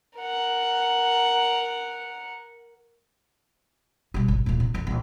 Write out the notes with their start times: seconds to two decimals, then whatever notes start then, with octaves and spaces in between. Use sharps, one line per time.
0.18 A#4 F#5
4.14 B2 G3
4.28 G#1
4.46 D1 A#2
4.60 C3
4.74 F2 D#3
4.87 A#1 D#2